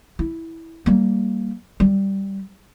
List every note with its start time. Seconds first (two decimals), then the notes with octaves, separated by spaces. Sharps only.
0.19 E4
0.86 G3 A#3
1.80 G3